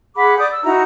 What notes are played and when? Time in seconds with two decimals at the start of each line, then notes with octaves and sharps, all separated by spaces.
0.16 G#4 F#5 B5 D6
0.38 D5 D6 D#6 G6
0.52 E6
0.64 D#4 E4 F#4 A#5